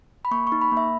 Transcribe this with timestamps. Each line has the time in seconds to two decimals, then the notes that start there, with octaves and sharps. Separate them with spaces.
0.25 B5
0.31 A#3 C#6
0.47 C#6
0.52 D#4
0.61 B5
0.72 A#3
0.77 E5